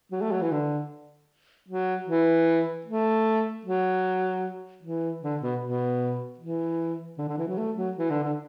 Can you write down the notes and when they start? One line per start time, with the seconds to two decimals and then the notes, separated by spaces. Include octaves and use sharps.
0.12 F#3
0.22 A3
0.32 F#3
0.42 E3
0.52 D3
1.69 F#3
2.08 E3
2.87 A3
3.65 F#3
4.83 E3
5.23 D3
5.42 B2
5.62 B2
6.39 E3
7.18 D3
7.29 D3
7.38 E3
7.48 F#3
7.58 A3
7.77 F#3
7.97 E3
8.10 D3
8.23 D3